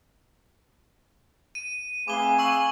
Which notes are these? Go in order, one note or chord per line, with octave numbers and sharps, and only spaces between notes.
D#7
A3 C4 G#4 B4 F5 G#5 D6 G7
C#6 E6 F#7